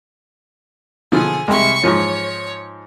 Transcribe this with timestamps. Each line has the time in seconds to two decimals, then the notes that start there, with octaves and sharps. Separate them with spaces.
1.12 B2 D3 F3 G#4
1.48 C2 G#3 E5 C#6
1.83 G#2 F3 C#5